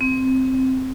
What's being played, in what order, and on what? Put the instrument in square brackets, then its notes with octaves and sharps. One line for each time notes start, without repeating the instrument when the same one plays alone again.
[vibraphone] C4